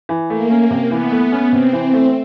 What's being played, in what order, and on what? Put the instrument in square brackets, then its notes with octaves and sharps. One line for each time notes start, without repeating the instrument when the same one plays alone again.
[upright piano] E3
[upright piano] A3 [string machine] A#3
[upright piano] C#4
C3
[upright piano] E3 [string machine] B3
[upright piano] A3
C#4
[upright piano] C3 [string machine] C4
[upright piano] E3
A3